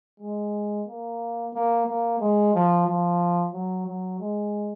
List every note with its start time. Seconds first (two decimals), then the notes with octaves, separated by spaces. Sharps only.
0.20 G#3
0.87 A#3
1.54 A#3
1.87 A#3
2.20 G#3
2.54 F3
2.87 F3
3.53 F#3
3.87 F#3
4.20 G#3